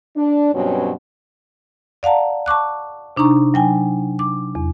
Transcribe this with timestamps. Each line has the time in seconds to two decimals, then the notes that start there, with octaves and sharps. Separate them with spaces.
0.17 D4
0.55 G2 B2 F#3 C4 C#4
2.03 D5 F5 F#5 A5 A#5
2.46 A5 C#6 D6 F#6
3.17 C3 D4 D#4 A#5 C#6
3.54 F#3 G5 G#5
4.19 D6
4.55 E2